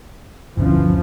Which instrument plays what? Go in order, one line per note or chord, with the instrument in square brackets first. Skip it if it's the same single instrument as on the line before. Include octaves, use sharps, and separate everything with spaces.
[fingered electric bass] G1 D2 C#4 [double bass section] E3 F3